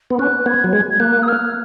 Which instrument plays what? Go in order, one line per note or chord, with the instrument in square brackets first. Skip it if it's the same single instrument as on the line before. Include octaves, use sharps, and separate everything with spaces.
[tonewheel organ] B3
[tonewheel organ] C#4 [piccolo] F#6
[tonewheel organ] B3 [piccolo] G#6
[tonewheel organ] F#3
G#3
[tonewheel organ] A#3 [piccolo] F#6
[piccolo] D#6
F6